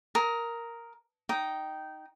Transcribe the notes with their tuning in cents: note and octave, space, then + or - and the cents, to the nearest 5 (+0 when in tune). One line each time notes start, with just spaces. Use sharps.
A#4 +0 D#6 +20
D#4 +0 G5 -15 D#6 +0